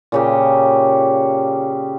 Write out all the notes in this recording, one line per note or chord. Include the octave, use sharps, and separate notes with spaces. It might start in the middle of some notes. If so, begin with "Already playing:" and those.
A#2 C#3 G4